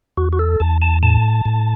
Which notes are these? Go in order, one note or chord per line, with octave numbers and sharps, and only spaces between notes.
E2 F#4
F#4
A4
E2 A5
A5
A2 A5
A2